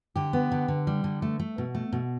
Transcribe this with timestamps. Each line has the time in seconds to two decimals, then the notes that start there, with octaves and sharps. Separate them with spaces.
0.16 D3 G4
0.33 B3
0.52 D3
0.68 D3
0.87 G3
1.04 D3
1.22 A3
1.39 A3
1.58 B2
1.75 A3
1.92 B2